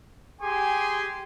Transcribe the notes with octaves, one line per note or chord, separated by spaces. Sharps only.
G4 G#4 G#5 C6